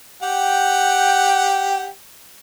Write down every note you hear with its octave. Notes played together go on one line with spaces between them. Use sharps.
G4 F#5 G5